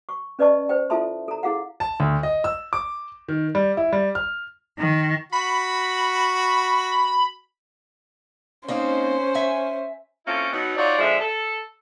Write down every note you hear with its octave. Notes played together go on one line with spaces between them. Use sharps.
C#6
C#4 B4 D5 D#5 A5 C#6
C5 G5
E4 F4 A4 E5 A5 C6
A4 A#5
E4 G#4 F5 F#5
A5
D2
D#5
E6
D6
D#3
G3
E4
G3
F6
D#3
F#4 B5
A#3 C4 C#4 D#4 C5
E5 G#5 A#5
A#3 C4 C#4 E4 F4 A4
B2 F#3 B3 D#4
D#4 F4 F#4 C#5 D5
D3 F3 G#3 D4 E5
A4